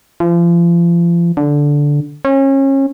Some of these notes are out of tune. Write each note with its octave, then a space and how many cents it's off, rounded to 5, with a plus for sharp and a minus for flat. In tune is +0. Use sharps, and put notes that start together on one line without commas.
F3 -35
D3 -10
C#4 -30